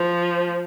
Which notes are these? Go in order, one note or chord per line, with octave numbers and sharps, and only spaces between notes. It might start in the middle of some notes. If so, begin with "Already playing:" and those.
Already playing: F3